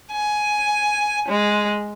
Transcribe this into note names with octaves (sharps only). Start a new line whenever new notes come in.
G#5
G#3